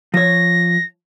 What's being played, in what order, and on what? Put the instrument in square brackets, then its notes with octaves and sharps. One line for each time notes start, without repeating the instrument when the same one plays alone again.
[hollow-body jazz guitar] F3 C#5 [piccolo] A#6